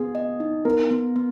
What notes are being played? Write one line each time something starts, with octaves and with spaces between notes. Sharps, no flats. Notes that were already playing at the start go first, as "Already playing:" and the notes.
Already playing: B3 G#4
D#5
D#4
B3 A#4
B3
B3